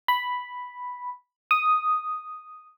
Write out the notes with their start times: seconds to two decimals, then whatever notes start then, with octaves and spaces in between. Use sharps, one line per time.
0.08 B5
1.51 D#6